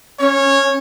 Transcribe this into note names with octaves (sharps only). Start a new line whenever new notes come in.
C#4 C#5